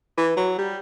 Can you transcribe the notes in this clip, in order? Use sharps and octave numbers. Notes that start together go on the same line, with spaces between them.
E3
F#3
G3